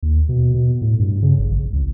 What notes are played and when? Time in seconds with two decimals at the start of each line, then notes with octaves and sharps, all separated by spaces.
0.03 D#2
0.29 B2
0.54 B2
0.82 A2
0.99 G2
1.23 C#3
1.39 G#1
1.50 A1
1.73 C#2